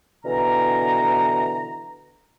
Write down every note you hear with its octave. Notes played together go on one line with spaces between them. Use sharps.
B2 D3 E3 A#5